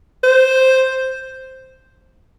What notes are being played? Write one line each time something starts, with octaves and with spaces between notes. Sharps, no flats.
C5